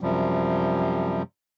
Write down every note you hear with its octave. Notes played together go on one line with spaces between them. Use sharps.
F#2 C3 F3 G3